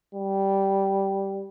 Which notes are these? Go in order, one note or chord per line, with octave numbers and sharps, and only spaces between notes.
G3